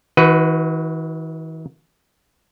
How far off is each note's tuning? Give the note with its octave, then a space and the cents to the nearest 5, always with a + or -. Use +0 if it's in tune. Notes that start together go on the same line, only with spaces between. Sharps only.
E3 -45 F#4 +0 B4 +15